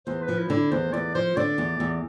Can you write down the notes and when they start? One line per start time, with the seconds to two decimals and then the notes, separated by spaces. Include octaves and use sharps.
0.07 E2 C5
0.23 B4
0.28 F3
0.39 E4
0.50 D3
0.56 E4
0.71 E2 C5
0.94 E2 D5
1.15 F3 C5
1.37 D3 D5
1.58 E2
1.80 E2